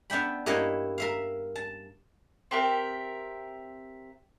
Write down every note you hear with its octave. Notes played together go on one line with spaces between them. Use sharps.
B3 D4 E5 G5 B5
G2 A#3 E4 G4 C#5 D#5
A#4 E5 F5
A5
C4 G4 A#4 E5